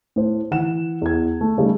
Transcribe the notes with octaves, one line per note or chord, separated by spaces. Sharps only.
A2 C5
E3 F#5 E7
E2 G#6
A3
C#3 G3 A3 D#4